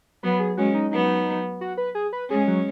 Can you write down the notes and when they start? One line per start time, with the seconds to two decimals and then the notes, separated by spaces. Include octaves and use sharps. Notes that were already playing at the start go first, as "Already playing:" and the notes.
0.22 F#3 B3 B4
0.39 G#4
0.57 G#3 C#4 F#4
0.74 D#4
0.91 F#3 B3 D#4
1.61 F#4
1.77 B4
1.95 G#4
2.13 B4
2.30 G#3 C#4 G#4
2.48 F#3